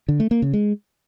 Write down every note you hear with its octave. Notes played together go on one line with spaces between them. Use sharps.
D3
A3
A#3
C#3
G#3